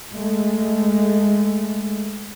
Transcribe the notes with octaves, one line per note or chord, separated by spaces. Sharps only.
G#3 A3